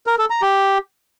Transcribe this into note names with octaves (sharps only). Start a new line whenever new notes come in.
A#4
A4
A#5
G4